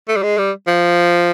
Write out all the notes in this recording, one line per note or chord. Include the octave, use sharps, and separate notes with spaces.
A3
G3
G#3
G3
F3